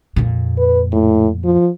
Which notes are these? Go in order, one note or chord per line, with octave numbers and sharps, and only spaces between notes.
F2 A#2
B4
A2
F3